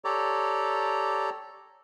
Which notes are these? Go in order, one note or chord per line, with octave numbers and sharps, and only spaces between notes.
G4 A4 C#5 D5 A#5